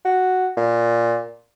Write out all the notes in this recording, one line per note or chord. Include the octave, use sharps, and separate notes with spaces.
F#4
A#2